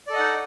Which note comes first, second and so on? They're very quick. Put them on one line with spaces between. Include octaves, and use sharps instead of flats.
D5 A4 D#5 F#5 D#4